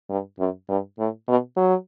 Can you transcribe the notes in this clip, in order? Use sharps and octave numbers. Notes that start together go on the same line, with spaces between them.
G2
F#2
G2
A2
B2
F#3